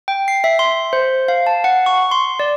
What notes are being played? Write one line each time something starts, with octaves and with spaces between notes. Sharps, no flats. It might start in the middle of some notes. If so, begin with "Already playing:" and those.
G5
C7
E5
C6
C5
F5
A5
F#5
C#6
C6
D5